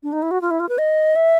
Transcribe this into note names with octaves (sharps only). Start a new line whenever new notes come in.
D4
D#4
E4
F#4
F4
E4
F4
B4
D#5
E5